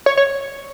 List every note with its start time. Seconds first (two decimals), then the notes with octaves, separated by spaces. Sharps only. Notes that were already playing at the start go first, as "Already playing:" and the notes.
0.06 C#5
0.17 C#5